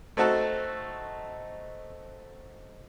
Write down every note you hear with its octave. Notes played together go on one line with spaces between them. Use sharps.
A3 C4 D#4 F#4 A4